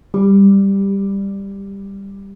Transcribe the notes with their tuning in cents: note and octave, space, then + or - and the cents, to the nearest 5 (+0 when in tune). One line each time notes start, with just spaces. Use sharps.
G3 +10